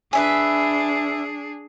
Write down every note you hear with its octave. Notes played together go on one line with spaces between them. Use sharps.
D4 G#4 B4 E5 G#5